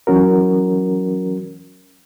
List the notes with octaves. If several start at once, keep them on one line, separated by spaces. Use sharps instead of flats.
E3 F#3 C#4 F#4 A#4